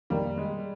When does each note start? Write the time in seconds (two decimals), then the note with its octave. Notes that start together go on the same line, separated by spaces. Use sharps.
0.10 F2 D#3 G3 A#3 D#4 A#4
0.38 G#3